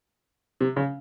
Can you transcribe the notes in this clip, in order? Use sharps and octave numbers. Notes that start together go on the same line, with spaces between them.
C3
C#3